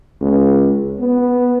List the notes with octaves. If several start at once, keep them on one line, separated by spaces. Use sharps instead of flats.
C#2
B3